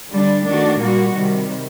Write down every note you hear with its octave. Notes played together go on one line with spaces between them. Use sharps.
D3 G3 D4
D#3 A3 D4 F#4
A#2 G3 A#3 F#4
C3 D#3 G3